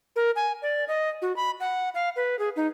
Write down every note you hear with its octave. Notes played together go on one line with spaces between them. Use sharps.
A#4
G#5
D5
D#5
F#4
B5
F#5
F5
B4
G#4
D#4